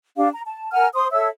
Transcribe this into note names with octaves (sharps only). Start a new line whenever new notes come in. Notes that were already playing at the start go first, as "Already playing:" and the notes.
D4 G4 F5
A#5
A5
A#4 F#5 G#5 F6
C5 C6 D#6
A4 C#5 E5 E6